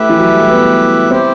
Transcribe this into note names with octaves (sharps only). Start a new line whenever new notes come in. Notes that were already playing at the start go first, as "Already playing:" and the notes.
Already playing: A3 E4 G4 B4 E5
E3
F#3
G3
A3
B3
C4 E4 G4 C5